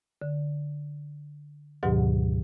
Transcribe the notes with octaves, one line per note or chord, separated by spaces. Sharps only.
D3
D2 G#2 B2 D#3 F#3 G4